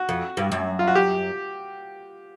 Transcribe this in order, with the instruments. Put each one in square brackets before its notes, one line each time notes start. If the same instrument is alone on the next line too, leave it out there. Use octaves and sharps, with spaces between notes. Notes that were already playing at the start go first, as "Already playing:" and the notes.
Already playing: [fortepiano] F#4
[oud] F2
G2
F#2
[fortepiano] F4
F#4
G4